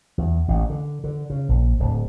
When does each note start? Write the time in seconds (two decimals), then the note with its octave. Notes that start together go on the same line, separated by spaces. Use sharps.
0.18 E2
0.48 A1
0.70 D3
1.04 D3
1.30 C#3
1.49 A#1
1.80 D1